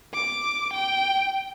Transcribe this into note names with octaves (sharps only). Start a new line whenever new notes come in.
D6
G5